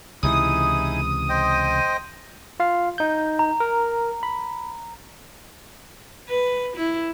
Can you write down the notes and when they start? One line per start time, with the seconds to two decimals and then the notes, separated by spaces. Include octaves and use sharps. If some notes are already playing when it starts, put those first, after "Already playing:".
0.23 C#2 C3 E3 D#4 E4 G#4 D#6
1.29 C5 D#5 G5
2.60 F4 F5
2.98 D#4 G6
3.39 A#5
3.60 A#4
4.23 B5
6.29 B4
6.76 E4